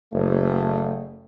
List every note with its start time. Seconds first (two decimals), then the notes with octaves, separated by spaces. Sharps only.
0.13 F#1 A3